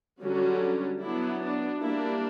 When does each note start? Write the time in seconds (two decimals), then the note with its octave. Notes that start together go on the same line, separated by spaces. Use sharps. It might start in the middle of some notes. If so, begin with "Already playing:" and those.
0.21 D3 F#3 G3 C#4 F#4
1.01 F#3 B3 D4 E4
1.41 D4
1.81 G3 A#3 D4 E4